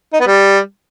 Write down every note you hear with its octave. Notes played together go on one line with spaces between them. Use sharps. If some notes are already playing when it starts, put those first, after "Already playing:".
D#4
B3
G3